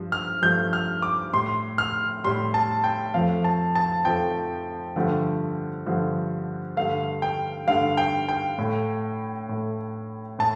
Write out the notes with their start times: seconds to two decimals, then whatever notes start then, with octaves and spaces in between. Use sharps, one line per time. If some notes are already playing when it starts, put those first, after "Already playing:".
Already playing: G2 F3
0.12 F6
0.42 G2 F3 A3 G6
0.73 F6
1.02 D6
1.33 A2 G3 C6
1.78 F6
2.24 A2 G3 C6
2.54 A5
2.84 G5
3.14 F2 F3 A3 F5
3.44 A5
3.75 A5
4.05 F2 F3 A3 G5
4.96 G2 D3 F3 A3
5.86 G2 D3 F3 A3
6.76 G2 D3 A3 F5
7.22 G5
7.67 G2 D3 A3 F5
7.97 G5
8.29 G5
8.58 A2 A3
9.49 A2 A3
10.39 A2 A5